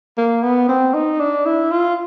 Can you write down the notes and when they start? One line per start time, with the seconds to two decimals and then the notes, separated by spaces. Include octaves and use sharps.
0.18 A#3
0.43 B3
0.69 C4
0.94 D#4
1.20 D4
1.45 E4
1.71 F4